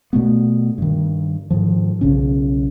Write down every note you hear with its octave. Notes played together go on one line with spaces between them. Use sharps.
B2 A3 B3
G2 D#3
G#2 D#3 F3
B1 C#3 C#4